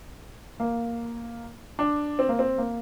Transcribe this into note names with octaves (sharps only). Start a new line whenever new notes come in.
A#3
D4
C4
A#3
C4
A#3